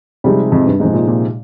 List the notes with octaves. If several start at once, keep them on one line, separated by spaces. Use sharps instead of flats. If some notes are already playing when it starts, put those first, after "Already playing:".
C3 F3 G3 G#3 D#4 G#4
F2
G2
G#2 C3 F3 G#3 D#4 G#4
A#2
A#2